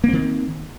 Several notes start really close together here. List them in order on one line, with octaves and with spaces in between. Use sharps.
A#3 C4 D#3